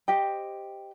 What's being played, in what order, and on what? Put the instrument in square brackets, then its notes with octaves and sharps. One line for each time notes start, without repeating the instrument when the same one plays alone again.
[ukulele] G4 C5 D#5 G5